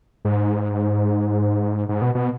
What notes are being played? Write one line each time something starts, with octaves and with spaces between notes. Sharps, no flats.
G#2
G#2
B2
B2